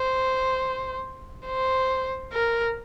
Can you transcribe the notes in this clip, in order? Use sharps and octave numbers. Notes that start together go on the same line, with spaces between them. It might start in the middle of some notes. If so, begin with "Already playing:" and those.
Already playing: C5
C5
A#4